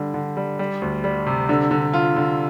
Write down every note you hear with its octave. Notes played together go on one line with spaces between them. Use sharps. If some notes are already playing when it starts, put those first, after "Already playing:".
Already playing: D3 G3
D3
G3
G3
D2
G3
C3
D3
D3
F4
D3